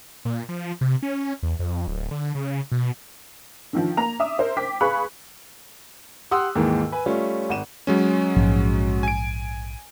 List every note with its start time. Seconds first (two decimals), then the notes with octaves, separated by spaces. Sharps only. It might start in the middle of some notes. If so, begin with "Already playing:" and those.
0.25 A#2
0.49 F3
0.81 C3
1.03 C#4
1.43 E2
1.59 F2
1.87 D1
2.11 D3
2.35 C#3
2.71 B2
3.73 D3 D#3 F3
3.97 A#3 A#5 F7
4.20 E5 D6 D#6
4.38 A#4 C5 E5
4.57 G5 D6 B6
4.81 G#4 B4 F5 B5 C#6 F#6
6.31 G4 F#5 C6 D#6 E6 F#6
6.55 D#2 G#2 D#3 E3 A#3
6.92 B4 G#5
7.06 G3 A3 C#4 F4
7.49 G#1 F#5 D#7 E7
7.87 F#3 G#3 C#4
8.36 A#1 G#2 F3
9.03 G#5 D7